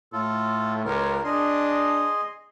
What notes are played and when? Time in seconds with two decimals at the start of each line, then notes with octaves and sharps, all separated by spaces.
0.13 A2 F4 A4
0.85 C#2 A#4
1.24 D4 G#4 D#5 C6